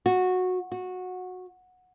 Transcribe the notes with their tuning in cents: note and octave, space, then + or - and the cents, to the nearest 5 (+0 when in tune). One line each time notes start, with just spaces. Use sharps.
F#4 -15
F#4 -15